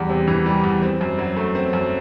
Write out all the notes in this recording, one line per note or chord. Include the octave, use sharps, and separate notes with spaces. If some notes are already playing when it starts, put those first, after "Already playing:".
Already playing: E2 G3
C3
E3
G3
E2
C4
F#2
F#3
A3
C4
F#2